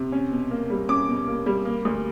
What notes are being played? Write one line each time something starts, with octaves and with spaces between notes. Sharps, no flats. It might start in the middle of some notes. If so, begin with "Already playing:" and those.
Already playing: C3
C#4
B2
A#3
G3
C#4 D6
B2
A#3
G3
A#3
D2